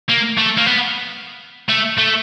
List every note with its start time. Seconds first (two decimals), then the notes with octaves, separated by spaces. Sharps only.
0.09 A#3
0.38 A3
0.58 A#3
0.67 B3
1.69 A3
1.98 A3